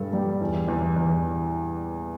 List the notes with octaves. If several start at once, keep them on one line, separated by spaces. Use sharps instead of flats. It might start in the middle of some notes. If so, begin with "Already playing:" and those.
Already playing: G2 G3 A4
G3
E2
E2
E2